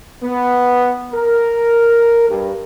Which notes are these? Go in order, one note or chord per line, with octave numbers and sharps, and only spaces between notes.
B3
A#4
G2